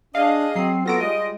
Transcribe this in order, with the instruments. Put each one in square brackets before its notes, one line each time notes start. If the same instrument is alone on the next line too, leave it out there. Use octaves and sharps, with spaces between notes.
[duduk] D4 [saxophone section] G#4 D#5 [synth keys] F5
[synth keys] F#3 C7 [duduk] C4
[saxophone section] F#3 A4 [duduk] B3 [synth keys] F4 A#6 D7
[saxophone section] G3 D#5 [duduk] G#3